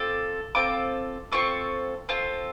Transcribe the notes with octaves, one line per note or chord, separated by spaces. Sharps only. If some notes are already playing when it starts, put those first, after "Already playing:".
Already playing: C4 F4 A4 D6
C4 F4 A4 D6
C4 F4 A4 C#6
C4 F4 A4